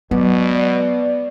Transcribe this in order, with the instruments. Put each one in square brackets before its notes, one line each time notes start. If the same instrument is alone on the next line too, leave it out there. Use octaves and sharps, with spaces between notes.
[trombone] B2 [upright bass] F#3 G#3 [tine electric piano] B3 [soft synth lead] D5